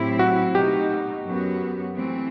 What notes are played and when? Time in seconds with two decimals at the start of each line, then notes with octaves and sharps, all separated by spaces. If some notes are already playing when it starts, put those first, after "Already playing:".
Already playing: A2 F#3 C4 E4 G4
0.19 F#4
0.55 B2 A3 D#4 G4
1.25 F#2 F#3 B3 F#4
1.95 E3 A3 C4